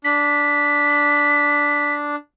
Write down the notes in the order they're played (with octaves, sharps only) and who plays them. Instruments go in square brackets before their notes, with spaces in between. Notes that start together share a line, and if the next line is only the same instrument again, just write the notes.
[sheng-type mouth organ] D4 [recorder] B6